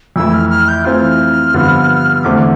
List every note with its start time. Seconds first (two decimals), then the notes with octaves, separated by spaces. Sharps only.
0.16 F2 E3 A3 E4 E6
0.34 F6
0.50 F6
0.68 G6
0.85 E3 A3 C4 F4 F6
1.54 G2 D3 F3 B3
2.23 E2 D3 A3 C4 D6